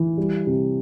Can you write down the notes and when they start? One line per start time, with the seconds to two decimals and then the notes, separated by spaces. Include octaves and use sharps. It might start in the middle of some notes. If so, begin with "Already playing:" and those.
Already playing: E3
0.18 G3
0.47 C3